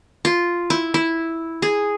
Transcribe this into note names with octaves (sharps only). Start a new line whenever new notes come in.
F4
E4
E4
G#4